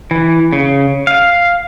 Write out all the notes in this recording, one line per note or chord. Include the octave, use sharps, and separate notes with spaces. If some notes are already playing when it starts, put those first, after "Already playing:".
E3
C#3
F5